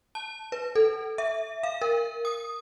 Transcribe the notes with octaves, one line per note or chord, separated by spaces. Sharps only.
A5
B4
A4
E5
F5
A#4
D#6